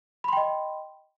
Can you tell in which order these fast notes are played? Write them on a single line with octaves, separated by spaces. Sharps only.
B5 C6 G5 D#5